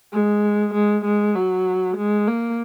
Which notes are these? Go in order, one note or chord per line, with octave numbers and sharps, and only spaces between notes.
G#3
G#3
G#3
F#3
G#3
A#3